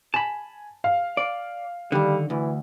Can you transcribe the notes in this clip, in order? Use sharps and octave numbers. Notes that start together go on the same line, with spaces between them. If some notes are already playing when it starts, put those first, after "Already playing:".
G#5 A5 B5
F5
D5
D3 D#3 G3
D2 E3